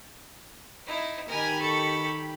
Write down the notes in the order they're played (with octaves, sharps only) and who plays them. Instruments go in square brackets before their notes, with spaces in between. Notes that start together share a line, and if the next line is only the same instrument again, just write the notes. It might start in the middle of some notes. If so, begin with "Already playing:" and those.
[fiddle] D#4 E4
[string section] D#3 G4 B5 [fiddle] A#4 G#5
[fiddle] A4 C#6